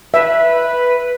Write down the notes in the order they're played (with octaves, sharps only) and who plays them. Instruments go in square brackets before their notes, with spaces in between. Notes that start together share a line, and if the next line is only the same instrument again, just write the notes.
[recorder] B4 [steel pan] E5